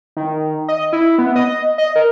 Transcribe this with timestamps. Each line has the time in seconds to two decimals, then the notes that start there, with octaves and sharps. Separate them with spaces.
0.17 D#3
0.68 D#5
0.93 E4
1.18 B3
1.36 D#5
1.78 D#5
1.96 A#4